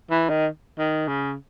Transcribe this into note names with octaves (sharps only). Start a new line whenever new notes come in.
E3
D#3
D#3
C#3